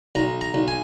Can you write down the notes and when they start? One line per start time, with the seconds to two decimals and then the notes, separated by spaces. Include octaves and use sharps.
0.15 B1 A#5
0.41 A#5
0.54 B1
0.68 G#5